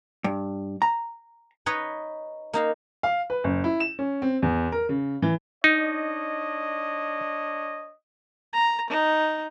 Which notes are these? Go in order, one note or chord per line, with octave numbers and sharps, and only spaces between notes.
G2
A#5
D#4 B4 C#5 D#5
A#3 D#4 F5
F5
B4
F#1
E4
E7
C#4
C4
E2
A#4
C#3
E3
D4 D#4 C#5 D#5
A#5
D#4